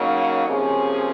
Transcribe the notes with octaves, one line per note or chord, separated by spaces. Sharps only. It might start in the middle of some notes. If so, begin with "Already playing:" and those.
Already playing: C#3 F#3 A#3 D#4
C3 F3 A#3 C#4 G#4